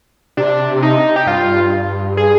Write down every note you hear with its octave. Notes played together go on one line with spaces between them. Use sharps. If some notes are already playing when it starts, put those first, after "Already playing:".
C3 D4
D#4
G4
G2 F4
G#4